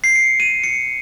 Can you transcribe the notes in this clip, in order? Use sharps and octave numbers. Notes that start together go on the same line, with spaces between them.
C7
C#7
D#7
C#7